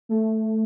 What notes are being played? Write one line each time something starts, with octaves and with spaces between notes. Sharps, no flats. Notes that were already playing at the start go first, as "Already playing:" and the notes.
A3